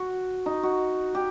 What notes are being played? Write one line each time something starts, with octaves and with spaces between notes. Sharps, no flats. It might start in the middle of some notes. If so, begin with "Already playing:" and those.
Already playing: F#4
D#4
F#4
G4